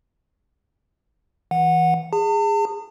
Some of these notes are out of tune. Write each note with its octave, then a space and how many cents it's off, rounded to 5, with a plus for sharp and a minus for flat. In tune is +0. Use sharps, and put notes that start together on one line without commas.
E3 -15 F#5 -15
G#4 -20 A5 +40